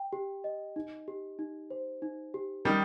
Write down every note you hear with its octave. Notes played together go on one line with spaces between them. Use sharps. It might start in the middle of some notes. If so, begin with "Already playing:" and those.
Already playing: G5
G4
D#5
D#4
G4
D#4
C5
D#4
G4
D#3 G3 A#4